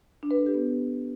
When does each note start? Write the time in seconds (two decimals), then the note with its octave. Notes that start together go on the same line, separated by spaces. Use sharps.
0.23 D4
0.31 B4
0.39 A4
0.46 G4
0.54 B3